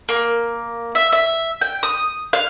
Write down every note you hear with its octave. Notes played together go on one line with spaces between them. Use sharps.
A#3
E5
E5
G5
D#6
F5